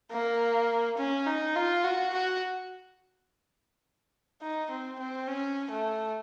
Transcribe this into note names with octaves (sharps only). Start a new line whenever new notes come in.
A#3
C#4
D#4
F4
F#4
F#4
D#4
C4
C4
C#4
A3